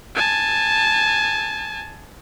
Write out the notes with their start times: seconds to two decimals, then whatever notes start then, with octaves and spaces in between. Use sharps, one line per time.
0.15 G#5 A5